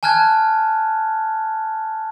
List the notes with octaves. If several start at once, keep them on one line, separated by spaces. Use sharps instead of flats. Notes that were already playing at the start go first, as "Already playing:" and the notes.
G#5 A5 F6 F#6 G#6